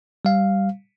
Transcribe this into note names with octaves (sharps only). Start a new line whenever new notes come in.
G3 F5